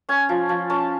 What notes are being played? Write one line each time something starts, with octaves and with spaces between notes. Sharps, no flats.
C#4 G#5
F3
F3
C#4 A5